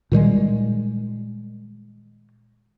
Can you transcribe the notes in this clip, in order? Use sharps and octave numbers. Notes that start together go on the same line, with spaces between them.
A#2 D#3 G3 G#3